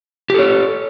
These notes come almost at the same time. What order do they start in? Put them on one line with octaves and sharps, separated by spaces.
G4 A4 C#5